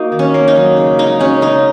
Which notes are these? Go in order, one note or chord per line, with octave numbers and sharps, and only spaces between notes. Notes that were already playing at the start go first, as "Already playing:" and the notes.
Already playing: A#3 D#4 F#4
D#3
C#4
A#3
D#4
F#3
C#3
G#3 D#4
G#3 C#4
C#3 D#4